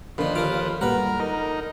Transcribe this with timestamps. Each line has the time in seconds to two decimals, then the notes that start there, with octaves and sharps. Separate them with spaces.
0.18 A#2 D3 D#3 F3 B4
0.36 D#2 F4 A#4 D6 F6
0.81 F#2 A#2 G3 A#4 B4 F#5
1.20 D#4 A#4